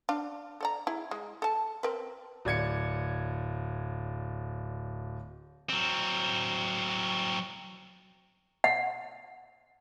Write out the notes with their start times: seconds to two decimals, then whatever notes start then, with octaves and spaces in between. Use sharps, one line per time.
0.09 D4 F5
0.61 A4 D5 A#5
0.87 E4 G#4
1.11 G#3
1.42 A4 A5
1.83 C4 A#4 B4
2.45 D1 D5 G#6 C#7
5.70 F#3 C4
8.64 F#5